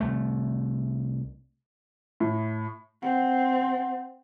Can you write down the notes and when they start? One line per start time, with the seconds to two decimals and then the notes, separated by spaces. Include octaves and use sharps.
0.01 C2 A3
2.20 A2
3.03 C4 F#5